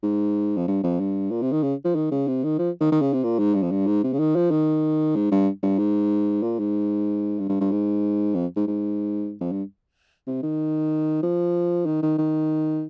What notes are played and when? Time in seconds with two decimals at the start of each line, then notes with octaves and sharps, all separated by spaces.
0.03 G#2
0.57 F2
0.68 G2
0.84 F2
1.00 G2
1.31 A#2
1.42 C3
1.52 D#3
1.63 C#3
1.85 F3
1.95 D#3
2.11 C#3
2.28 C3
2.44 D#3
2.59 F3
2.81 D#3
2.92 D#3
3.01 C#3
3.13 C3
3.24 A#2
3.39 G#2
3.55 G2
3.63 F2
3.71 G2
3.87 G#2
4.04 C3
4.13 C#3
4.19 D#3
4.36 F3
4.51 D#3
5.16 G#2
5.32 G2
5.63 G2
5.79 G#2
6.43 A#2
6.59 G#2
7.39 G2
7.49 G2
7.60 G2
7.72 G#2
8.35 F2
8.56 G#2
8.67 G#2
9.41 F2
9.52 G2
10.27 C3
10.43 D#3
11.23 F3
11.86 D#3
12.02 D#3
12.18 D#3